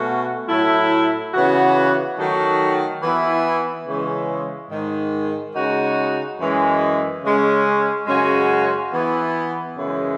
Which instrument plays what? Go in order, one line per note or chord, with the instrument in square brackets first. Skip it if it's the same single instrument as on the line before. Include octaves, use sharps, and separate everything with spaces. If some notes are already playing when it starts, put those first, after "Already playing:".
Already playing: [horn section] B2 A3 C#4 F#4
A2 F#3 A3 E4
C#3 E3 B3 F#4
D#3 F#3 A3 D#4 F#4
E3 B3 E4
C#3 E3 G#3
G#2 D#3 G#3
C#3 G#3 D#4 F#4
F#2 E3 G#3
C#3 G#3 C#4
F#2 C#3 G#3 C#4 F#4
E3 B3 E4
F#2 C#3 E3 G#3